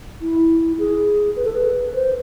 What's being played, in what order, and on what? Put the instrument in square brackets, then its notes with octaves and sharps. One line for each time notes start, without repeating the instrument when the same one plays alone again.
[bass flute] E4
G#4
B4
A4
B4
C5